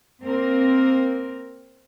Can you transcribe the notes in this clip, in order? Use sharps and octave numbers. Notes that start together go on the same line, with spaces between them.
A#3 C4 A#4